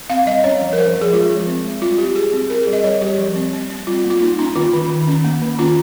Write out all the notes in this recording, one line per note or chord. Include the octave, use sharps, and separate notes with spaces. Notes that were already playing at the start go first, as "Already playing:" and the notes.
C4 F5
G3 D#5
C#4 C#5
F3
A#4
F3 C5
F3
G#4
G#3 F4
F3
C4
G#3
G3 F4
C4 G4
C4 G#4
C4
C4 A#4
G#4
G3
D#5
G3 C#5
G3 G4
F3
C4
C4
C4
G3 F4
A#3
F4
A#3 D#4
C#4 D#4
D#3 F4
D#3
D#3
C#4
A#3
D#3
C#4 F4